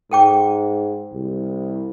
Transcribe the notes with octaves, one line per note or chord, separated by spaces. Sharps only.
G#2 A4 G5 D6
C2